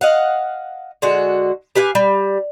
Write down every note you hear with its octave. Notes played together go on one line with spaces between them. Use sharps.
D#5 F5 F#5
D3 G#3 F#4
G4 B4 F5 G#5
G3